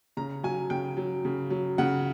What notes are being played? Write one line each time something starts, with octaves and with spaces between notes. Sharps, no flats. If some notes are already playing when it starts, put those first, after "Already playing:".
C#3 A#5
F#3 G#5
C#3 G5
F#3
C#3
F#3
C#3 F#5